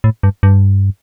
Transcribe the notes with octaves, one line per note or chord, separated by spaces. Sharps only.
A2
G2
G2